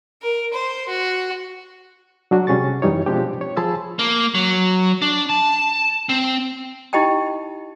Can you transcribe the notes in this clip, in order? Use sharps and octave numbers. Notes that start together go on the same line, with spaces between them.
A#4
C5
F#4
F#3 D4 F#4
C3 G3 C#4 G#4 C#6 A6
F#2 E3 G3 D#4 C#5
B2 F3 G#3 C4 D4 G4
C#5
F3 G#4 A5 B5 C6 E6
A#3
F#3
D4
A5
C4
D#4 E4 G4 D#5 G5 A5